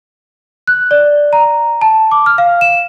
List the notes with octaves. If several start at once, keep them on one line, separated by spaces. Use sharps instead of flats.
F#6
D5
A#5
A5
D6
F6
F5
E7